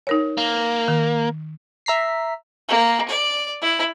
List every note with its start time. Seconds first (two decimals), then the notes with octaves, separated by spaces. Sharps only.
0.07 D#4 A#4 C#5
0.38 A#3
0.88 D#3
1.86 E5 A#5 B6 C7
2.69 A#3
3.08 D5
3.61 E4